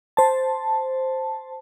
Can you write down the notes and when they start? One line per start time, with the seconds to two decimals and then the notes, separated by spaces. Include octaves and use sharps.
0.17 C5 A5